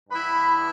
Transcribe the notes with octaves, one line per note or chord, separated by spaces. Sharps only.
G2 E3 B3 E4 B4 B5